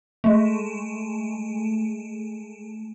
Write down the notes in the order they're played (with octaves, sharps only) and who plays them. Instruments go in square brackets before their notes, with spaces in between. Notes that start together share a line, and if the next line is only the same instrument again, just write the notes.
[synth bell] G#3 A3